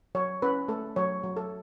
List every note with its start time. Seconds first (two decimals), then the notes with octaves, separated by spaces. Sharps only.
0.15 F#3 C#5
0.42 C#4 B4
0.68 A3 A4
0.96 F#3 C#5
1.23 F#3
1.37 A4